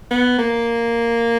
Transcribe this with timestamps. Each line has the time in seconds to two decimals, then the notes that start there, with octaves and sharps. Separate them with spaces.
0.11 B3
0.38 A#3